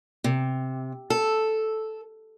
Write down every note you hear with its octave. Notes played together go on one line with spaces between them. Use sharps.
C3
A4